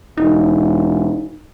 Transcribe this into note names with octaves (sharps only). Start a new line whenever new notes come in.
E1 D#4